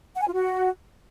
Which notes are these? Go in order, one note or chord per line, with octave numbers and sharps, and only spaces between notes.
F#5
G#5
F4
F#4